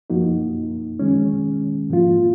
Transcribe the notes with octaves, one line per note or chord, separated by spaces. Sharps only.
F#2 F3 A#3 D#4 F#4
D#3 G#3 C#4
G#2 F3 A#3 F4